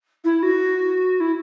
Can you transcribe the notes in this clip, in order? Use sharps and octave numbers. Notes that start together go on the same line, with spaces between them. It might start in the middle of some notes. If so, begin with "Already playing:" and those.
E4
F#4
E4